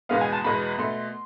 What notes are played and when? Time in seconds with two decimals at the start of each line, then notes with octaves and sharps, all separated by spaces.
0.09 E2 B2 G#3 B3 F5
0.21 G#5
0.33 A5
0.44 E2 B2 G#3 B3 B5
0.78 B2 A3 C6